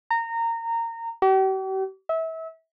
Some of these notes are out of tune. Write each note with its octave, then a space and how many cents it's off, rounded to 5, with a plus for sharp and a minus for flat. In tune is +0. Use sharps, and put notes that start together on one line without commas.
A#5 -20
G4 -45
E5 -30